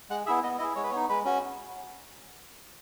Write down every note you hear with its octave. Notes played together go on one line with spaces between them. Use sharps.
G#3 F#5
B3 E4 G#4 E5
B3 D#5
E4 G#4 D#5
G#3 C#5
B4
B3 D#4 C#5
G#3 B4
C#4 F#4